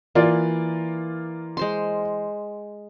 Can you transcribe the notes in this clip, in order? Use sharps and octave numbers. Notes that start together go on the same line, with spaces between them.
E3 A#3 F4 D5
G#3 C5 C6